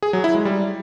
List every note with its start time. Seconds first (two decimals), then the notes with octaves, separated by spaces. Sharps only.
0.03 G#4
0.13 F#3
0.24 E4
0.35 G#3
0.45 G3